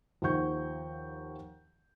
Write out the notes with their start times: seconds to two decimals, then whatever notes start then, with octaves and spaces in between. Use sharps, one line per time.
0.22 D#2 F3 C5 F#5 C#6 G6